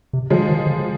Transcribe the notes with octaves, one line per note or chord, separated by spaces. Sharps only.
C3
D3 F3 G#3
D#3
D3